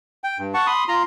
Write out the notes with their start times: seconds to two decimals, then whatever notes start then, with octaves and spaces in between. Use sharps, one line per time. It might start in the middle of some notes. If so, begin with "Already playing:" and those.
0.24 G5
0.39 G2
0.54 F#5 A5 C#6
0.67 B5 C6 D#6
0.88 F4 A#5 C6